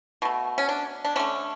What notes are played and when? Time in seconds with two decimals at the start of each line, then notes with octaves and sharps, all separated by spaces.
0.22 B2 A3
0.58 C#4
0.69 D4
1.05 D4
1.16 D3 A3 C#4